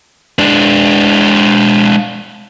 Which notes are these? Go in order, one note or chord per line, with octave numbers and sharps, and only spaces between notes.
G#3 D4